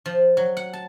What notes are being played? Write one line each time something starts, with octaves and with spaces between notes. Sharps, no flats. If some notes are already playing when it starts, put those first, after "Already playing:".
F3
F#3
F#5
A5